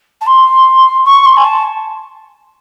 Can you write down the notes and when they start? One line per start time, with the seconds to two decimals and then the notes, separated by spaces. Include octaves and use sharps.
0.21 A5
0.26 C6
1.05 C#6
1.25 C6
1.37 G#5
1.45 A5